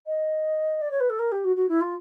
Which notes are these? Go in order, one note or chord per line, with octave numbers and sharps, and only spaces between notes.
D#5
D5
C#5
B4
A4
A#4
G4
F#4
F#4
E4
F4